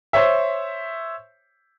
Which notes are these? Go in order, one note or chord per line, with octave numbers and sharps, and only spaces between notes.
C5 C#5 E5